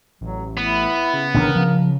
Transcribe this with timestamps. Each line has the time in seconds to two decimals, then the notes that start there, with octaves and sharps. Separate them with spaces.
0.21 A1 F#3
0.57 B3 E4
1.14 C#3
1.34 A1 D#3 D4 A#4
1.56 F3